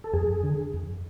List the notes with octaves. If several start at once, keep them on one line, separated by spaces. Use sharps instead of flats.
A4
F2 G#4
D3
F2